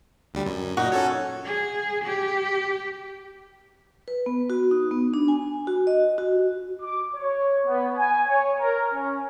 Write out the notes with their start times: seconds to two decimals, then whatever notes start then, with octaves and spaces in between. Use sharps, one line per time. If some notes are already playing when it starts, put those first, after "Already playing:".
0.34 D2 G3
0.46 F#2
0.77 A#2 D#4 F#4
0.92 C#4 A4 C#5
1.46 G#4
2.04 G4
4.08 B4
4.26 B3
4.50 F#4
4.71 D#4
4.91 B3
5.14 D4
5.28 G#5
5.67 F#4
5.87 D#5
6.18 F#4
6.82 D6
7.15 C#5
7.66 B3
7.96 G#5
8.27 C#5
8.59 A#4
8.93 C#4